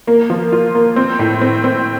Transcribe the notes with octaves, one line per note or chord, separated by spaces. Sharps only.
A#3
F3
F4
A#3
C4
A2
C4
C4